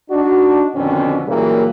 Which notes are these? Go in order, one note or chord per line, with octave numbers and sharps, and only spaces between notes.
D4 D#4 F#4
F2 B2 D3 D#3 C4 C#4
A#2 C#3 E3 F#3 G3 A#3